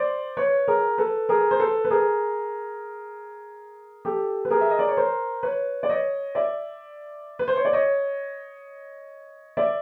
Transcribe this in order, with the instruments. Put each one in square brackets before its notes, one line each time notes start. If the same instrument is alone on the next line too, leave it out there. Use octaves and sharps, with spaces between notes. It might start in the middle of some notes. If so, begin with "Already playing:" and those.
Already playing: [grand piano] C5 D5
B4 C#5
G#4 A#4
A4 B4
G#4 A#4
C5
A4 B4
B4
G#4 A#4
G4 A4
B4
G#4 A#4
E5
D#5
D5
C#5
A#4 C5
B4 C#5
D5
C#5 D#5
D5 E5
B4
C5
C#5
D5
C#5 D#5
D5 E5